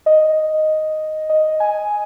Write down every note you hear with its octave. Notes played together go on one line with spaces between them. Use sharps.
D#5
D#5
G#5